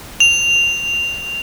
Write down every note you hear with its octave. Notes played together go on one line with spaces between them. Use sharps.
F7